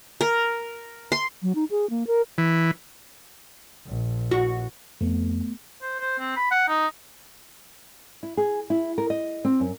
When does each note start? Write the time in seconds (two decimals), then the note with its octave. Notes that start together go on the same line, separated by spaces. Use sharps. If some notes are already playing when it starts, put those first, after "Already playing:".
0.21 A#4
1.12 C6
1.42 F#3
1.55 D#4
1.71 G#4
1.90 A#3
2.07 A#4
2.38 E3
3.86 A#1
4.31 F#4
5.01 F2 A3 B3
5.82 C5
6.00 C5
6.19 C4
6.37 B5
6.51 F#5
6.68 D#4
8.23 E4
8.37 G#4
8.70 E4
8.98 A#4
9.10 D#5
9.45 C4
9.60 F#2